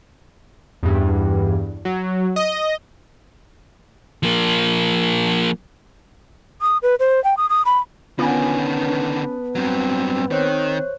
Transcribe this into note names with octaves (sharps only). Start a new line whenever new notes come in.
E2 G2
F#3
D#5
F3 A#3
D#6
B4
C5
G5
D#6
D#6
B5
D3 D#3 B3 C#4 F4 G#5
A5
G2 F#3 C4
D#3 C4 C5 C#5 F#6